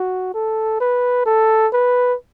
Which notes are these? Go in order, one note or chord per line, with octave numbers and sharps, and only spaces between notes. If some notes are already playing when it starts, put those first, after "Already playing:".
Already playing: F#4
A4
B4
A4
B4